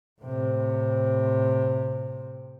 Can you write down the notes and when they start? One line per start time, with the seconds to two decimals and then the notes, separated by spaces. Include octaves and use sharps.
0.21 A2 C3